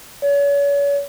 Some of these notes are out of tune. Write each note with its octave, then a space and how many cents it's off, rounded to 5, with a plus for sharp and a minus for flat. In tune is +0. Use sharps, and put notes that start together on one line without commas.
C#5 +40